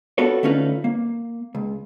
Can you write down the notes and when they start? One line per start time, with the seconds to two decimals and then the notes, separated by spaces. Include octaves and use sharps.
0.18 B3 F4 F#4 A4 B4 C#5
0.43 D3 A3 C#4 D#4 F4 B4
0.84 A#3
1.55 C#2